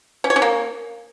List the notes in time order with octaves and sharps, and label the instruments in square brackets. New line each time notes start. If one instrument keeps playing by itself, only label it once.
[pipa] C#4
C#5
C#4
A#3